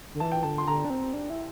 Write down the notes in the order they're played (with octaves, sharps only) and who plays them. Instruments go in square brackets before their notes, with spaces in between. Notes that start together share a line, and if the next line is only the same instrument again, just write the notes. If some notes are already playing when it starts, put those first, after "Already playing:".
[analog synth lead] D3
[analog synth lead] E3 [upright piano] A5
[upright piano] G5
[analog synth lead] D3 [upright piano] A5
[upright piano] C6
[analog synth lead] D3 [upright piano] A#5
[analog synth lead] D4
C4
D4
E4